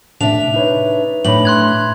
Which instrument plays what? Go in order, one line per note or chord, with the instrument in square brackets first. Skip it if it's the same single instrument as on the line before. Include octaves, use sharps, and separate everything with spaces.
[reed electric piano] A2 C3 [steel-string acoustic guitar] D4 E5 [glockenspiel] F7
[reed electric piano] D#4 B4 C#5
[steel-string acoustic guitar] A2 D4 [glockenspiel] B5 F#7
[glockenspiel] C6 F#6 G#6